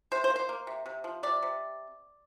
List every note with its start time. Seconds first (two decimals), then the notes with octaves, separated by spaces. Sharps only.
0.12 C3 C5
0.24 C5
0.30 A#3
0.36 C5
0.49 A#3
0.67 C3
0.86 C3
1.04 F3
1.23 C3 D5
1.42 C3